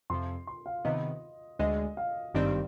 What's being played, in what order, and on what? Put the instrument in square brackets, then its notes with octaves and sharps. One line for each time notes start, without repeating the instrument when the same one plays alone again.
[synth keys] F2 C3 F3 [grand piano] C6
[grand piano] C6
F5
[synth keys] C3 D#3 B3 [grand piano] D#5
[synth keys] D2 D3 G#3 [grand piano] D#5
[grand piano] F5
[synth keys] G#1 G2 D#3 G3 C4 [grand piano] D5